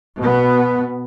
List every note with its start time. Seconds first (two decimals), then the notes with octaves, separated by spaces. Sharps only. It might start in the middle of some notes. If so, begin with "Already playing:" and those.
0.17 B2 B3